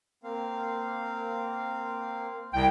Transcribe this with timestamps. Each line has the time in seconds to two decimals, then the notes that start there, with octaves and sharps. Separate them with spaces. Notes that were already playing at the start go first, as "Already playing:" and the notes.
0.23 A#3 C4 F5
2.53 C2 C3 G5